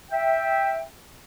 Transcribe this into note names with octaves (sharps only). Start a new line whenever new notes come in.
E5 G5